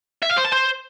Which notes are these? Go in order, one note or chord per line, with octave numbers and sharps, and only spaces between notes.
E5
F5
C5
A5
C5